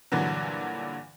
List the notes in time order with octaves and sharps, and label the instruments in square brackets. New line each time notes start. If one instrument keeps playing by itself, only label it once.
[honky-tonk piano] G2 A#2 D3 E3 F#3